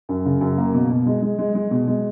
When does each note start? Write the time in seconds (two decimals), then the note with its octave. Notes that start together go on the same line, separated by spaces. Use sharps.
0.09 F#2
0.26 C#3
0.41 F#2
0.58 A#3
0.74 B2
0.90 B2
1.06 G#3
1.22 G#3
1.39 G#3
1.55 G#3
1.71 B2
1.87 G#3